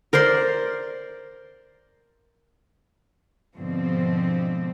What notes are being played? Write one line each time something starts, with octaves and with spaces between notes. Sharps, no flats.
A#4 C5 D5 C6
G#2 B2 D3 F3 C4